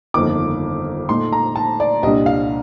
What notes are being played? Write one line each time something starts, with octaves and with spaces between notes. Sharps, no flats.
G1 F2 D#3 A#3 D#4 D6
A#2 A3 D#4 C6
A#5
A5
D5
C2 A#2 G3 D4 D#5
F5